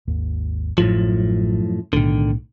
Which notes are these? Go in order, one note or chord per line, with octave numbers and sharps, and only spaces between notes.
G#1 D#2
A1 F#2 A2 F3
B1 A2 D3 D#3